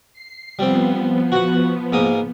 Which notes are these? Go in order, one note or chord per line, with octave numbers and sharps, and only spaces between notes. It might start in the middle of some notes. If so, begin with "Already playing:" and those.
C7
F3 G3 B3 C4
F#4 F#5
G#2 A#3 D#6